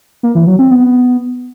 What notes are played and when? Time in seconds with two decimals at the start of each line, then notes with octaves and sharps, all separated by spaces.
0.23 A#3
0.35 E3
0.47 F#3
0.59 C4
0.71 B3